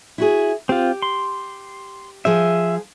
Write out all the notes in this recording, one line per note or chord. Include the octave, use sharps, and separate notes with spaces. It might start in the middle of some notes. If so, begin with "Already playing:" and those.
E4 F#4 G#4
C4 F4 G4
C6
F3 G#4 C5 E5